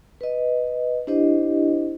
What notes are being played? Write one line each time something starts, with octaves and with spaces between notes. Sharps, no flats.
B4 D#5
D4 E4 G4 C5 D#5